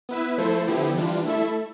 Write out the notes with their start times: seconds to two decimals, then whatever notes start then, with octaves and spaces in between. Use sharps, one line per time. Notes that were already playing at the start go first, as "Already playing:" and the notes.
0.09 B3 E4 B4 E5
0.38 F3 A3 E4 A4 C5
0.67 D3 F3 B3 E4 G4
0.96 E3 G3 D4 F4
1.25 A3 E4 A4 E5